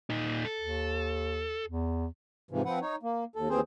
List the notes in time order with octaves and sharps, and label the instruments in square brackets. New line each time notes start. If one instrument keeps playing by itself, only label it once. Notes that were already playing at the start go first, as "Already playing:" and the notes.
[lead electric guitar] A#2 D#4
A4
[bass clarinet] D#2
E2
[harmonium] G#2 C3 E3 F3
F3 C4 B4 F#5
D#4 C#5
A#3
D#2 A4
D#2 E3 C4 G#4 C5